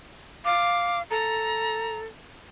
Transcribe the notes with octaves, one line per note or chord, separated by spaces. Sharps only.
F5 D6
A4 A#5